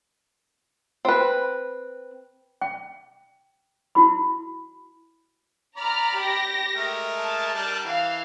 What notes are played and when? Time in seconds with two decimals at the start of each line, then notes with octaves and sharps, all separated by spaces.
1.05 C4 B4
2.62 G5
3.95 E4 F#4 B5
5.77 D5 A#5 B5 F6
6.16 G4 A#6
6.76 G#3 A3 A#4
7.17 A5
7.54 G3 D4 A#4
7.85 E3 F5